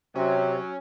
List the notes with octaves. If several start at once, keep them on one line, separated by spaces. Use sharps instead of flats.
C3 F#3 C#4